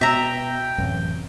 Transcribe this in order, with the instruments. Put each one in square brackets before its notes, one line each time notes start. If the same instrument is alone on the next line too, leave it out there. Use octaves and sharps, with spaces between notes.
[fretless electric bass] B2 [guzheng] E5 A#5 [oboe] G5
[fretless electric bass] A1 [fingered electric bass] F#2 C3